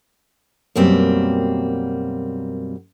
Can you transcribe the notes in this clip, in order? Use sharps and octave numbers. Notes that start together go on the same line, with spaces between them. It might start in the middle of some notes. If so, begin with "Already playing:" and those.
F#2 B2 G3 A#3 C4